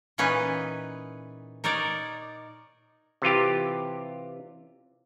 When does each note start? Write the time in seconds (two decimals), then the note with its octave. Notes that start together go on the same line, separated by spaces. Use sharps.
0.18 A#2 E3 C#4 D#4 G#4 B4
1.64 D#4 A#4 C#5 D5
3.22 C3 E3 F4 G4